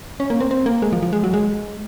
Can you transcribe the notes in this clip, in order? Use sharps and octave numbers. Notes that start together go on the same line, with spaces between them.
C#4
A#3
C4
C4
A#3
G#3
F3
F3
G#3
F#3
G#3